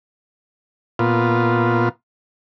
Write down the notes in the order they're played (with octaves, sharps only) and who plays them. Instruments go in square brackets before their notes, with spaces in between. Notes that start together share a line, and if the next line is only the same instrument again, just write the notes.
[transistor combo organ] A#2 B3 F4